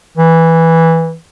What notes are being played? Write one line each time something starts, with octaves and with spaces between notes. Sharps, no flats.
E3